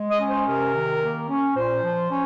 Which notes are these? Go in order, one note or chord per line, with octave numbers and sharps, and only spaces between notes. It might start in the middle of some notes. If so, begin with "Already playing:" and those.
Already playing: G#3
D#5
C#4
C5
C3 A#4
D#3
A#3
C#4
A#2 C5
F3
C#4